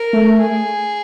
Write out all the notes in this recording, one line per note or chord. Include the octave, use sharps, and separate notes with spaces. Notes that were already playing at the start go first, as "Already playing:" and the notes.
Already playing: A#4
A3
G#4